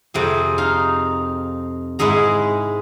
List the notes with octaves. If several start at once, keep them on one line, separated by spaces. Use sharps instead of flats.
F2 C3 G#4
D#4 F5
G#2 G#3 E4 G#4 A#5